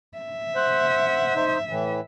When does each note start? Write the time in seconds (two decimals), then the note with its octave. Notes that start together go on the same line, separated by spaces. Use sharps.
0.18 E5
0.55 C5 F#5
1.36 D#4 C5
1.69 A2 E3